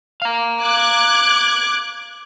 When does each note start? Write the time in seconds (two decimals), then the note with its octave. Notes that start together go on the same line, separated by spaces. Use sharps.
0.22 F5 A#5
0.62 D6 F#6 G#6